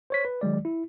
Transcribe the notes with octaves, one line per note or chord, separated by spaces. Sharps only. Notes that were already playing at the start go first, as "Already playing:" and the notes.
C5 C#5 B6
B4
D#3 F#3 G#3 D5
E4